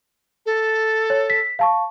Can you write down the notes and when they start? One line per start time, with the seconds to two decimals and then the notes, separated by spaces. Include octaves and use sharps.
0.46 A4
1.10 C#5
1.30 B6
1.59 F5 A5 C#6